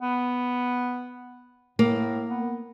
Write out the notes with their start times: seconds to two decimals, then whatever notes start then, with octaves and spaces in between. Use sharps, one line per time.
0.02 B3
1.79 A2 A#3
2.29 B3